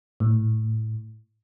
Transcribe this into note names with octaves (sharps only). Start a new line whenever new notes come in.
A2